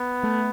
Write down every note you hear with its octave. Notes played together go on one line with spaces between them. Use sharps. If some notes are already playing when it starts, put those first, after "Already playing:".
Already playing: B3
A3